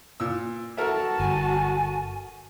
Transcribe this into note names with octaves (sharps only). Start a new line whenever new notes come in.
A#2 E6
F#4 A4 A#4 E5 A5
G1 G#5